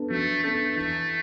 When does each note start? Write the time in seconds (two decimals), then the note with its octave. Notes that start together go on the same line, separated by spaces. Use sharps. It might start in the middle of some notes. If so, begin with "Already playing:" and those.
Already playing: B3 D4 A4
0.10 F#3 A3
0.43 A3 B3 D4 A4
0.76 E3 A3